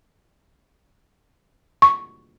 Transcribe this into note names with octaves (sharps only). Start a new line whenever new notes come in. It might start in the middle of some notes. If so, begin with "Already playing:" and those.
C#6